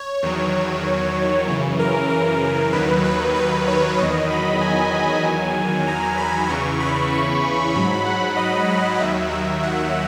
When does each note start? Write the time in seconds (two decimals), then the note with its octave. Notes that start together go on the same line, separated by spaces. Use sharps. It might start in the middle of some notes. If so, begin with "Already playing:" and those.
Already playing: C#5
0.23 E2 D#3 F#3
1.48 F#2 C#3 E3
1.79 A#4
2.10 A#4
2.73 D#2 D#3 F#3 B4
3.04 B4
3.36 B4
3.68 C#5
3.98 E2 D#3 F#3 D#5
4.30 B5
4.61 G#5
5.24 E2 D#3 F#3
5.87 A#5
6.18 B5
6.49 E2 C#3 E3 C#6
6.80 B5
7.12 C#6
7.75 G#2 F#3 B5
8.05 F#5
8.37 D#5
9.00 D#2 D#3 F#3 E5
9.31 E5
9.63 F#5